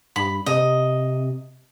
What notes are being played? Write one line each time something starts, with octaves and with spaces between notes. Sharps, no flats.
G2 B5
C3 D#5